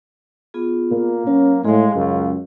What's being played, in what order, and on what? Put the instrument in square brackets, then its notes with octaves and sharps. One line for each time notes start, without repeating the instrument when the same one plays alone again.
[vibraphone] B3 F4 G#4
[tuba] A#2 [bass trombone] A#3
[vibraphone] F#3 [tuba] C#4
[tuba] A2 [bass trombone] G#3 [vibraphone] G#4 F5
[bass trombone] C#2 [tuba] F#2